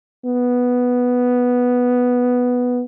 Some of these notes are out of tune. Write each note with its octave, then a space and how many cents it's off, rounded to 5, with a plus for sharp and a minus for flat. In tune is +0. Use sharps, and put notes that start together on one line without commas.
B3 +0